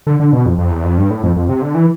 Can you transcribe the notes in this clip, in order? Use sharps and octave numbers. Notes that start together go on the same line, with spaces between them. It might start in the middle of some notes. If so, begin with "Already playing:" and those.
D3
D3
B2
F2
F2
E2
F2
G2
A2
F2
F2
C3
D3
E3